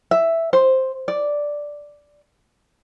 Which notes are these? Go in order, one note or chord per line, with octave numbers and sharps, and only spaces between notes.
E5
C5
D5